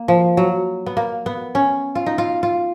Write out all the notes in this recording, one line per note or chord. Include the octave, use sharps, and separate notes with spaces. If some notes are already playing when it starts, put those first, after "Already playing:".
Already playing: A#3
F3
F#3
B3
A#3
B3
C#4
F4
D#4
F4
F4